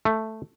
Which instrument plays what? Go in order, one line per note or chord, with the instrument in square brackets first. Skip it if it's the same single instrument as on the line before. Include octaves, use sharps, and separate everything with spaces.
[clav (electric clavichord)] A3